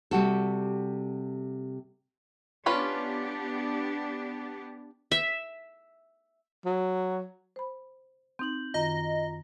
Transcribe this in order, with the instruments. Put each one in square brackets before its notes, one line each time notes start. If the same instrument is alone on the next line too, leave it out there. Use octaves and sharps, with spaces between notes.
[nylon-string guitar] C3 G3 F#4 A4
[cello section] B3 D4 G4 [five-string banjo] C#4 F4 B4
[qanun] E5
[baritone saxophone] F#3
[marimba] C5 B5
[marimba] C4 D#4 [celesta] G6 F#7
[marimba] F#2 D#3 [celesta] F4 A#5 A#6 [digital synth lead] D#5